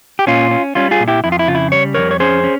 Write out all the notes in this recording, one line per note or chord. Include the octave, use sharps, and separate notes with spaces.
G4
A#2 C#4 F4
C#4
G3 C#4 F4
F4 G#4
A#2
E4 G4
F2 E4
F4
E4
C#3 F4
E4
G3 C#5
F2 A#4 C#5
C#5
C#4 G#4 C5
C#4